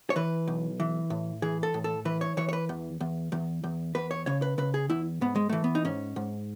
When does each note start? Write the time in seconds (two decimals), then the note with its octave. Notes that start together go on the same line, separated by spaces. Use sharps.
0.10 C#5
0.16 E3 B4
0.47 B1
0.80 E3
1.10 A2
1.42 E3 G#4
1.63 A4
1.74 A2
1.84 A4
2.05 E3 B4
2.21 C#5
2.37 E3 C#5
2.49 C#5
2.53 B4
2.69 E2
3.00 E2
3.32 E2
3.64 E2
3.95 E2 B4
4.11 C#5
4.26 C#3 C#5
4.42 B4
4.58 C#3 B4
4.74 G#4
4.90 E2 E4
5.21 G#2 B3
5.36 G#3
5.49 E3 A3
5.64 B3
5.75 D#4
5.85 G#2 C#4
6.16 G#2